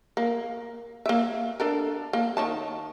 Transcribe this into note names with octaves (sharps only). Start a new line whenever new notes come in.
A#3
A#3 E5
D4 A4 A#4
A#3
D#3 C#5 A5